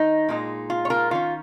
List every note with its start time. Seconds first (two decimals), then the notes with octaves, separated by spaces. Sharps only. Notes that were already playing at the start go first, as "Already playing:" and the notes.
Already playing: D#3 D#4
0.29 A#2 G#3 D#4
0.70 F4
0.85 C#5
0.90 F4 A#4
1.11 D#3 C#4 F4